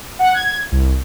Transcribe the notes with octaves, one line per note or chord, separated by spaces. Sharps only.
F#5
G#6
C2